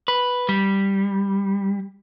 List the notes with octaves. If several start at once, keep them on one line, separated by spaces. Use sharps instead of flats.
B4
G3